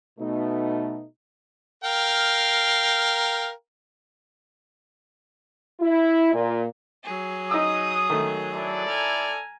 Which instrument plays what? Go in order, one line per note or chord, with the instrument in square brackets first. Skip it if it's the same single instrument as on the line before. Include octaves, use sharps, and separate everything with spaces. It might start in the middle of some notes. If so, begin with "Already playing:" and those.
[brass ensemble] B2 A3 D#4
[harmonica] A#4 F5 G5
[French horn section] E4
A#2
[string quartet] F#3 G#4
[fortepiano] D#4 E6 [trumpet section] D#6
[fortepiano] D#3 A3
[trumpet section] E4 A4 D5
[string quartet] G#5 A#5 F6